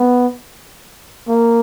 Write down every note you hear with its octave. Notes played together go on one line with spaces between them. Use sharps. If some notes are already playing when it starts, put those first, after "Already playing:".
Already playing: B3
A#3